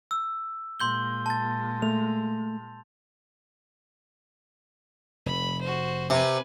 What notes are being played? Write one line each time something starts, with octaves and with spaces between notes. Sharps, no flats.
E6
A#2 G#3 C6 G6 G7
A5 A6
A3 F7
F1 B5
F#4 C5
C3 B4 G#5